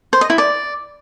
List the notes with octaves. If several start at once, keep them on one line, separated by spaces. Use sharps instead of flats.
C5
D#5
E4
D5